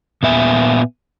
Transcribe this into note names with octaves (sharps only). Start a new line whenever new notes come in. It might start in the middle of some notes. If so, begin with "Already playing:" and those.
A#2 B3 E5 G#5